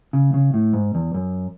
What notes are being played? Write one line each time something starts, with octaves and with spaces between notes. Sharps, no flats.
C#3
C#3
A2
G#2
E2
F#2